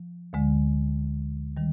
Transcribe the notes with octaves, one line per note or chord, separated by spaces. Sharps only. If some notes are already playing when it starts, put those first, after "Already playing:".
Already playing: F3
D2 D3 G#3
D#3 G3